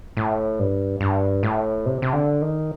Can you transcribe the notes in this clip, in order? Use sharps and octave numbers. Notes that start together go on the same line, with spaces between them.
A2
G2
G2
A2
C3
C3
D3
D#3